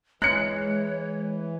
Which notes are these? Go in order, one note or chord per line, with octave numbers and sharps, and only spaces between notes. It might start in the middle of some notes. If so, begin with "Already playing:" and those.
E3 G#3 C#5 F#6 C#7